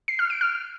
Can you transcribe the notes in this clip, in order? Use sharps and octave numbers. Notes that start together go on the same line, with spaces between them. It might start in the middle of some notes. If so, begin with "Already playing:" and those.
C7
F6
D7
F6